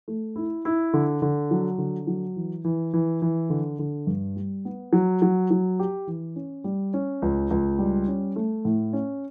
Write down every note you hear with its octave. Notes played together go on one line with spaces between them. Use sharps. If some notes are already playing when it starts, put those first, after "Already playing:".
A3
E4
E4
D3
D3
F#3
D3
F#3
E3
E3
E3
E3
D3
D3
G2
G3
B3
F#3
F#3
F#3
G4
E3
C#4
G3
C#4
C#2
C#2
G3
C#4
A3
A2
C#4